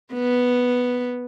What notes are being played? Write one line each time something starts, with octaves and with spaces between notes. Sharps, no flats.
B3